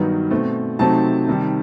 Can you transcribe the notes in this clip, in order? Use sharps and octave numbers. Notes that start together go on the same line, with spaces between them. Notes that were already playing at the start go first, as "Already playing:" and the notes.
Already playing: G2 D#3 F#3 B3 D#4
B2 A3 C4
C3 F#3 A3 C4 D#4 A5
C3 D#3 G3